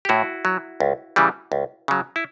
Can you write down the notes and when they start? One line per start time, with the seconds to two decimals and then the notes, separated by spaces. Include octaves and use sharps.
0.05 G4
0.09 A2 E4 F#4
0.45 F#3
0.80 C#2
1.16 C#3 E3 G3
1.52 C#2
1.88 C#3 F#3
2.16 E4